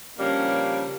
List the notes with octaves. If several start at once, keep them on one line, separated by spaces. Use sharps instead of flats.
C#3 F3 G3 A#3 C#4 D4